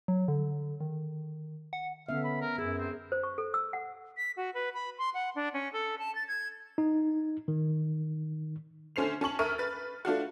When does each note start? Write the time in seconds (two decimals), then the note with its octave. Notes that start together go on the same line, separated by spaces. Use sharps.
0.08 F#3
0.28 D3
0.80 D#3
1.73 F#5
2.09 D3 B3 C#4 E5 F5
2.24 B5
2.41 A#4
2.58 F#2 E4 G#4
2.78 C4
3.12 C5
3.23 C#6
3.38 A4
3.54 E6
3.73 F#5
4.17 B6
4.37 F#4
4.54 B4
4.74 B5
4.98 C6
5.14 F#5
5.36 D4
5.54 C#4
5.73 A4
5.99 A5
6.15 A6
6.28 G#6
6.78 D#4
7.48 D#3
8.96 D3 A3 C#4 C5 C7 F7
9.21 C#4 A5 C#6 F#7
9.39 D2 A#4 E5 C#6 F6 D#7
9.58 B4 A6
10.05 A3 D4 F4 F#4